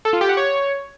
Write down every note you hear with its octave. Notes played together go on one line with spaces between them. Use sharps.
A4
F4
G4
F#5
C#5